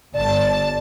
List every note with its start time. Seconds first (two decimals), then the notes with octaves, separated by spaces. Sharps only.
0.14 G1 D5 A5